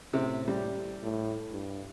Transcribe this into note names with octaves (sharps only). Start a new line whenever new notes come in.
A2 C3
G3
A2
G2